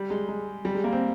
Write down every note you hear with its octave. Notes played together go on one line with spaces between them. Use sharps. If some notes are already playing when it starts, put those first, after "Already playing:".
Already playing: G3
G#3
G#3
G3
G#3
A#3
C4